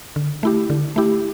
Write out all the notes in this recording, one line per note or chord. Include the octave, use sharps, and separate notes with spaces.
D3
A3 E4 G4
D3
A3 E4 G4